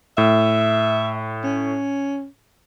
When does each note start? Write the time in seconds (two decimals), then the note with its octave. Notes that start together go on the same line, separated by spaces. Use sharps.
0.18 A2 E5
1.44 C#4